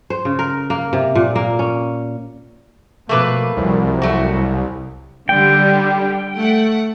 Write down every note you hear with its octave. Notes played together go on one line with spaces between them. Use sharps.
C5
C#3
A#4
A#3
C3
A#2
A#3
C#4
B2 F3 A3 A#3 B4
C2 F2 F3 F#3
A3 F#4
D3 G3 G5
A3 F#5